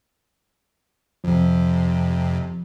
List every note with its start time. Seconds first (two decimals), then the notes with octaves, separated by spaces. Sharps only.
1.24 F2 C3 F3